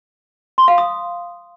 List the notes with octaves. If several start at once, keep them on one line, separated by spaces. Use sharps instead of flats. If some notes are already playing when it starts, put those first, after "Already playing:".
C6
F5
D#6